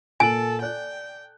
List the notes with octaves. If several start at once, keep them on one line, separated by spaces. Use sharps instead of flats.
A#2 A4 G#5 F#7
D5 G5 F#6